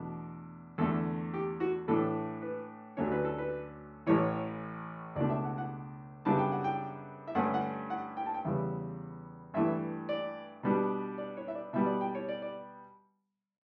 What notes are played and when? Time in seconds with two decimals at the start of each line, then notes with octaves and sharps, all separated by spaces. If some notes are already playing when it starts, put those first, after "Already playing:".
Already playing: E2 B2 A3 D4
0.78 E2 D3 A3 A4
1.34 G4
1.60 F#4
1.88 A2 E3 A3 D4 A4
2.42 B4
2.97 D2 D3 F#3 A3 C#4 C#5
3.12 B4
3.25 A4
3.38 B4
4.07 A1 A2 E3 C#5
5.16 C#2 B2 A3 D4 D5
5.30 E5
5.44 F#5
5.58 F#5
6.25 F#2 C#3 G3 B3 D4 A5
6.39 G5
6.52 F#5
6.64 G5
7.28 E5
7.35 G2 D3 A3 C#4 F#5
7.54 F#5
7.90 F#5
8.17 G5
8.26 A5
8.34 G5
8.45 E2 C#3 G3 B3 E5
9.54 G2 E3 A3 E5
10.09 D5
10.63 B2 G3 B3 D4
11.18 D5
11.37 C#5
11.48 E5
11.55 D5
11.73 B2 G3 B3 E5
11.86 D5
12.01 G5
12.15 C#5
12.29 D5
12.42 D5